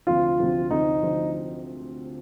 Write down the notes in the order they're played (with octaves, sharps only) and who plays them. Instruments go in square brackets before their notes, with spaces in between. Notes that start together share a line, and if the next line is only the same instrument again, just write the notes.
[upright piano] D2 C3 F3 C4 [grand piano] F4
[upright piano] D2 C3 F3 C4
[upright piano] D2 C3 F3 C4 [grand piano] D#4
[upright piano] D2 C3 F3 C4